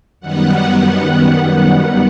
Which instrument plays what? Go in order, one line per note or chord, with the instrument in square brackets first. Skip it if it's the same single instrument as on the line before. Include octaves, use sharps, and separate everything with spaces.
[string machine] F#2 D#3 G3 B3 F#5